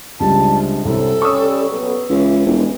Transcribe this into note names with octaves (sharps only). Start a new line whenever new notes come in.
C#2 C3 G3 G#3 D4 A5
C2 F#2 C3 A4
G3 C#4 C#6 D#6 E6
A#2 F#3 B3
C#2 E3
E1 F3 G3 G#3